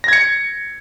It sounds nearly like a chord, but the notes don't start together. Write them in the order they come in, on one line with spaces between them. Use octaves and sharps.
A#6 G#6 C#7